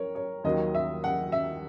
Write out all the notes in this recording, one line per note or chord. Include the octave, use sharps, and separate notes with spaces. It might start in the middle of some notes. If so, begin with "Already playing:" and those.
Already playing: A#4 C#5
C#5
D#2 D#3 F#3 D#5
E5
F#5
E5